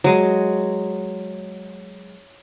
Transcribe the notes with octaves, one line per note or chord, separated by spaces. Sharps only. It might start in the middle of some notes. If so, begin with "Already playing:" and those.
F#3 G#3